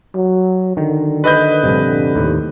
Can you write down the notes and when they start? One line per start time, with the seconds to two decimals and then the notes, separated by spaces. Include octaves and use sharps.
0.15 F#3
0.77 D3 D#3
1.24 B4 D#5 G6
1.63 A#1 G2 C3
2.15 D#2 A2